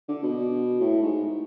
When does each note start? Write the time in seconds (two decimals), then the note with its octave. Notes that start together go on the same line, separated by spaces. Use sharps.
0.08 D3
0.23 B2
0.80 A2
1.02 G#2